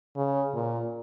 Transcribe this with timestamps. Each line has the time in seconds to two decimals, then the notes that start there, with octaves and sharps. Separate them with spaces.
0.16 C#3
0.54 A#2